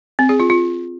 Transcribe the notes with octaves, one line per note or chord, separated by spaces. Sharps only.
C4
G#4
F4
F4